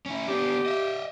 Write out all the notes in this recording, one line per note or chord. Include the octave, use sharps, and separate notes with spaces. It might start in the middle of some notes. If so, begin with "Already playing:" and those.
C#4 E4
B3 D4 G4
D#5 E5